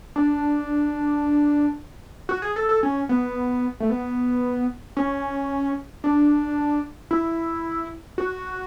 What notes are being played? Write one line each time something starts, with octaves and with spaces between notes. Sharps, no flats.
D4
F#4
G#4
A4
A4
C#4
B3
A3
B3
C#4
D4
E4
F#4